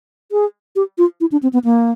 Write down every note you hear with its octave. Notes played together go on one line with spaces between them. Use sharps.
G#4
G4
F4
E4
D4
C4
B3
A#3